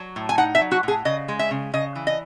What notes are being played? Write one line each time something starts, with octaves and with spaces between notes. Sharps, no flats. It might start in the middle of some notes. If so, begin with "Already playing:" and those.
Already playing: F#3
A2
G#5
D#4 F#5
E5
F#3
F#4
A2 G#4
C#3 D#5
G#3
E5
C#3
C#3 D#5
E3
D#5